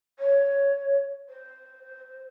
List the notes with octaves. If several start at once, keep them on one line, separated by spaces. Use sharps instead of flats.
C#5
C5